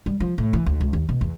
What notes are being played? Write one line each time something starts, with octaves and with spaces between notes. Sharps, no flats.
G3
F3
A2
E3
D2
C#2
D#2
B2
E2